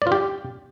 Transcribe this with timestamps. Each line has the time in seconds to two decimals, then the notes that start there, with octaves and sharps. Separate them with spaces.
0.02 D5
0.07 F4
0.12 G4